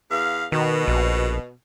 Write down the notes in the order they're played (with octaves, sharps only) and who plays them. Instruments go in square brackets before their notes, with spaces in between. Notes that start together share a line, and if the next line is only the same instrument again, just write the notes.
[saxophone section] E2 F5
[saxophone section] B2 [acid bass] D#3
[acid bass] A#1